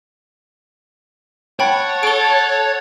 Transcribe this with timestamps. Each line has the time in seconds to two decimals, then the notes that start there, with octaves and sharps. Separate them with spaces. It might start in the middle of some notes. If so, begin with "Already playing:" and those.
1.60 C#5 F#5 G5 A5 B5
2.03 A4 D7 G7